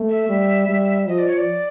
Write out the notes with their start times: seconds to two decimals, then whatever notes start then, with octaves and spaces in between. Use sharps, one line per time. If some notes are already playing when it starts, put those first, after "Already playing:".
Already playing: A3
0.10 E5
0.29 G3
0.69 G3
1.08 F3 D#5
1.19 D5
1.27 C#5
1.38 D5